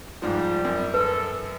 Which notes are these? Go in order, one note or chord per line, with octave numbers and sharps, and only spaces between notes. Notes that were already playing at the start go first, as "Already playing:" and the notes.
G#2 F3 G3
F#2
A4 B4